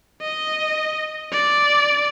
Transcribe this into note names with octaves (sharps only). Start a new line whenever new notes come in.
D#5
D5